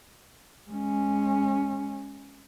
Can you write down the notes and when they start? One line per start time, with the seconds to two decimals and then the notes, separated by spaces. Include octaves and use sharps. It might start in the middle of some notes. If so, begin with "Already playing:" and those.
0.71 G#3 C#4